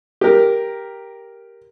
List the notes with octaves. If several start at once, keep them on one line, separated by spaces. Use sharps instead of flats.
G4 A#4